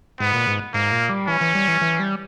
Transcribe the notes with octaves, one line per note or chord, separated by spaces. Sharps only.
G#2 B3
A#2
G#2
G#2 A#3
A#2
G3
E3 C#4
E3
G3
E3
E3
G3